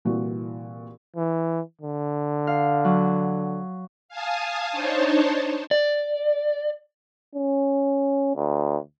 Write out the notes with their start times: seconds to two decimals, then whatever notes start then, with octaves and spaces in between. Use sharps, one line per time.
0.05 C2 A#2 E3 F#4
1.16 E3
1.82 D3
2.47 F5
2.85 F#3
4.09 F5 G#5 A5 D#6
4.71 D4 D#4 C5 C#5 A5
5.71 D5
7.36 C#4
8.36 D2